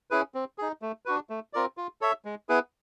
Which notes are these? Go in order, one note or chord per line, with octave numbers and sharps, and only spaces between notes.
C#4 E4 G#4 B4
C4
D#4 G#4
A3
D4 F#4 B4
A3
C4 F4 A#4 D5
F4
A4 C#5 E5
G#3
B3 E4 G#4 B4